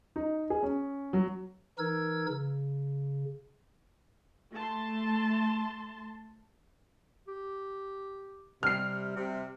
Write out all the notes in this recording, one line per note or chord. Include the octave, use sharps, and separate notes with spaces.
D#4
G#4
C#4
F#3
E3 D#4 A#4 E6 G#6
C#3
A3 A5 C6
G4
C3 G3 F6 C7
C3